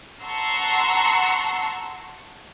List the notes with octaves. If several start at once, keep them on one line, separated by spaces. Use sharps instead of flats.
F#5 A5 A#5 C6 C#6 E6